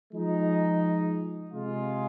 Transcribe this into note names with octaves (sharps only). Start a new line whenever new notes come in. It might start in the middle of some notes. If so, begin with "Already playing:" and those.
F3 G#3 D#4
C3 G#3 F4